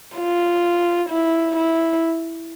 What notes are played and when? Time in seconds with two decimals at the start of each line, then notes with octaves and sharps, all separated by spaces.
0.18 F4
1.09 E4
1.56 E4